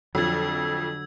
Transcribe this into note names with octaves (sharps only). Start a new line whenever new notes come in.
F2 D3 F3 F#3 E6 G#6